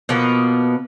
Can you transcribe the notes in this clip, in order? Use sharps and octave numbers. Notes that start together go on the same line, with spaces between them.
B2 F3 A#3 B3